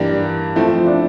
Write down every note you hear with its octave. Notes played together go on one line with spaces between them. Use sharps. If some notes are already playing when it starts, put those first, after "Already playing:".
Already playing: G2 E3 A#3 D4 G4
F3 A3 C4 E4
F4
E4
D4